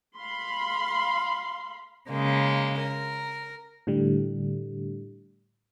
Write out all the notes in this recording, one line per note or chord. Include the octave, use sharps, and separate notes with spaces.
F5 B5 C6
C#3 G#3 A#3
A#4
A2 D3 G3